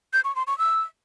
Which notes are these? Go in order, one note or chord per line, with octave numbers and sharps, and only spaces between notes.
G6
C#6
C6
C#6
E6